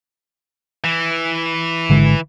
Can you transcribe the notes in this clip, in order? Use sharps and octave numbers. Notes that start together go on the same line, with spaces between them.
E3
G#1 D3 G#3